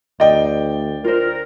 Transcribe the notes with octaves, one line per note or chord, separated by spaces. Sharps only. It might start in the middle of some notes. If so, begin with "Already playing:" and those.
D2 D5 D#5 F5 G5
F4 A#4 C5